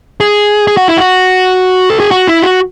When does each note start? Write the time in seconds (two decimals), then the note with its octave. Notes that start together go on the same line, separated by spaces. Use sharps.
0.20 G#4
0.67 G#4
0.77 F#4
0.88 E4
0.97 F#4
1.90 A4
2.00 G#4
2.11 F#4
2.28 E4
2.42 F#4